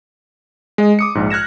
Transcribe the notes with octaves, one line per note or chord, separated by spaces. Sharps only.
G#3 D#5
D6 D#6 C#7
A#1 G#2
F6 F#6 G#6 A#6 E7